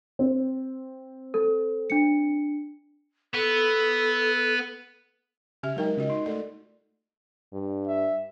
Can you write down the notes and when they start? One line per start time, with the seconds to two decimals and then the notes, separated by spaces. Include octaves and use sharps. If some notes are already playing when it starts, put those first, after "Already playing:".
0.19 C4
1.34 A4
1.90 D4 C#7
3.34 B3 A4
5.63 C#3 G4 E5 G#5 F6
5.76 F#3 G#3 D#4 A#4 G5
5.97 C#3 F4 F#4 D#5
6.10 D#4 C6
6.26 A3 A4 D5
7.53 G2
7.87 E5